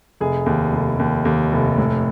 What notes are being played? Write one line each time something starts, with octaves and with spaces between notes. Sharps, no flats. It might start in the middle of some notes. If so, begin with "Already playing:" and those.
F1 G#4
D#2
F1
D#2
D#2
F1
A2